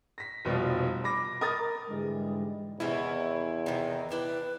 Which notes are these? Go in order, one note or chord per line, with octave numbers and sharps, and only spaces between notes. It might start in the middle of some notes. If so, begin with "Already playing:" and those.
A#6 B6
F1 B2 F3 G3
B5 D6 A#6
A#4 D#6 A6
G#2 D3 E3 G3 G#3
E2 C3 D#3 C#4 E4
C3 D#3
D4 E4 G4 B4